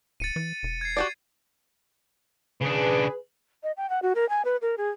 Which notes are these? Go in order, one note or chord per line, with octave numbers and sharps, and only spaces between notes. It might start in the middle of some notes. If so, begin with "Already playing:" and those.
D1 A6 C#7 D#7
E3
E1
G#6 C7
F#4 G4 D5
C#3 D4 G#4 B4
D#5
G5
F#5
F#4
A#4
G#5
B4
A#4
G#4